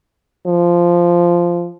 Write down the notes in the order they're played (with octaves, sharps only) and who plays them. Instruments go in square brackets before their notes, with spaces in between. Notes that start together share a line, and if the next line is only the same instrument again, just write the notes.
[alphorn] F3